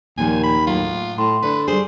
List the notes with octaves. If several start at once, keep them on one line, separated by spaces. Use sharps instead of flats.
D#2 A#2 F3 A#3 G#5
B5
A2 F#3 F4
A2 C6
D3 D4 B4
G3 G#4 C5